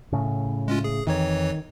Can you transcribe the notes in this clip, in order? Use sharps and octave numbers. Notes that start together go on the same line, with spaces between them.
A2 C#3
G#3 C#4 F4
G#4
F2 D#3 E3 C#5